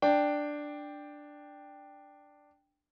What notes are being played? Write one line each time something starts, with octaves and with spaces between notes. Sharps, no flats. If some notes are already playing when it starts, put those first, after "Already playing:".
D4 G5